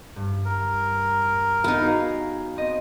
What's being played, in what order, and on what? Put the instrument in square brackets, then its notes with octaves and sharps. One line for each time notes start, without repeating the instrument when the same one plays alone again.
[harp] G2
[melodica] A#4
[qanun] B3 D#4
[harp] F#4 G#4 F5
C4 D#5